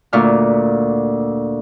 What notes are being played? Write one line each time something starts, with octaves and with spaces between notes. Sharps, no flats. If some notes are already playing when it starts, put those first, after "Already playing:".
D2 A#2 F6